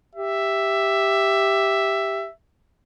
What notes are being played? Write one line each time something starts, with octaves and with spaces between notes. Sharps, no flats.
G4 E5